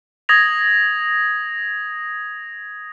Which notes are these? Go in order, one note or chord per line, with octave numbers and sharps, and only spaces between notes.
D#6 G#6 A#6 F7